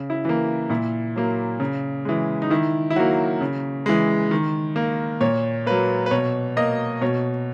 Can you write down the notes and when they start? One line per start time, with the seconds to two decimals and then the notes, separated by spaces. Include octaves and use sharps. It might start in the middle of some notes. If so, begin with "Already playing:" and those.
Already playing: C#3
0.10 E4
0.25 E3 A#3
0.70 A#2 E4
1.16 F#3 A#3
1.60 C#3
2.05 E3 G#3
2.42 D#4
2.50 D#3 E4
2.90 E4
2.96 F#3 A#3 F#4
3.41 C#3
3.86 E3 G#3
4.31 D#3
4.76 A#3
5.21 A#2 C#5
5.66 F#3 A#3 B4
6.06 B4
6.11 B2 C#5
6.57 A#3 D#5
7.01 B2 C#5